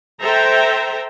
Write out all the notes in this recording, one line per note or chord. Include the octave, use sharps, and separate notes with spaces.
A4 C5 E5 G5 A#5